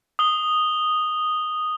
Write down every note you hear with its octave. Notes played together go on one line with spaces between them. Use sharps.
D#6 G7